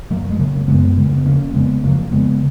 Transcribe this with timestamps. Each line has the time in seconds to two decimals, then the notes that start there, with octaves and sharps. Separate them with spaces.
0.10 F#2 F#3 A#3
0.30 G#3
0.39 C#3 F#3 A#3
0.61 A#3
0.68 F#2 G#3 B3
0.97 C#3 G#3
1.06 A#3
1.17 B3
1.26 F2 A#3 C#4
1.54 C#3 G#3 B3
1.83 F2 F#3 A#3
2.11 C#3 G#3 B3